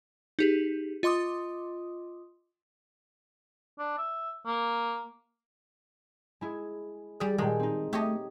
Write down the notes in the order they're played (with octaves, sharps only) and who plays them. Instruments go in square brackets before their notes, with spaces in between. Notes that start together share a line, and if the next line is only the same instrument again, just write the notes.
[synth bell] D#4 G4 G#4
F4 D#5 C6 D6 D#6
[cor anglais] D4
E5
A#3
[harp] G#3 E4 G#4
[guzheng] G3 D5 [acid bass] G#4
[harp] A#2 A4 G5 [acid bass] D#3 [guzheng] G#3
[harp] C4 D#4
[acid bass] A3 [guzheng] G4 C#5 D#5